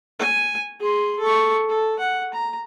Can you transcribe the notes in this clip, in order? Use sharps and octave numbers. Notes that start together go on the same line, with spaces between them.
G#5
G#4 C6
A4 C#6
A4
F#5
A#5